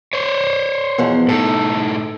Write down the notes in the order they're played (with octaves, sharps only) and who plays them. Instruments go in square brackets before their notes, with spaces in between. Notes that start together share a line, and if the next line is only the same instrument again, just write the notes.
[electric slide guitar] C5 C#5
[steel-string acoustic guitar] E2 B2 F3
[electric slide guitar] A2 D#4 [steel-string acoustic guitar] A4